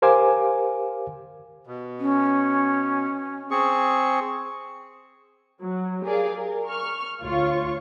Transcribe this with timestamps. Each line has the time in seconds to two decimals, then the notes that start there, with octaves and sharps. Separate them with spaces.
0.02 G4 A#4 C5 F5 G#5 D6
1.67 B2
1.99 C#4
3.51 C4 G#4 C#6
5.63 F#3
6.04 G4 G#4 A#4 D5 F5
6.36 A#4
6.67 C#6 F6
7.22 D2 F4 C#5 C#6